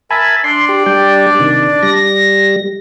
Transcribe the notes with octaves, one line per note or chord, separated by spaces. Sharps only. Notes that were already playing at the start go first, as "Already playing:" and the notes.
A#4 E5 G#5 A5 B5
D4 D5 C6
G4
G3 G5
C3 D#3
G3 A#6